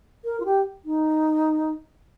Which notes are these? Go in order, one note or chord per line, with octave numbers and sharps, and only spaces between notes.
A#4
F4
G4
D#4